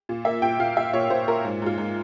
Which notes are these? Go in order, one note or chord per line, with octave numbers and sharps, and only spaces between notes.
A#2
A#3 E5
A#2 G5
A#2 F5
A#2 E5
A#2 C#5
A#2 C5
A#2 A#4
G#2
G#2 F4
G#2